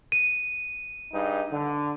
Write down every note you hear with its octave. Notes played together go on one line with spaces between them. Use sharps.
D#7
G2 D#4 G#4
D3